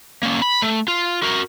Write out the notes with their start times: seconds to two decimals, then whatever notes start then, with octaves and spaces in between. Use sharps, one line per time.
0.23 A#3 C#4
0.42 B5
0.62 A3
0.88 F4
1.23 F#4 A#4